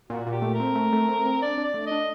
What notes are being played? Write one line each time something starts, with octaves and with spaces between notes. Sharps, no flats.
A#2 F#4
A#2
G4
A3
A#4
C4
A3
A3
C4
C4
D4 D5
D4
D5
A3
D#5
D4